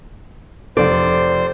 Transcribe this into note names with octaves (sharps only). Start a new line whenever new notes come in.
F1 A4 C5 D5